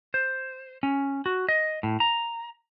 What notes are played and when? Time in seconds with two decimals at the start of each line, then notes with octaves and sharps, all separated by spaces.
0.14 C5
0.83 C#4
1.26 F#4
1.49 D#5
1.83 A2
2.00 A#5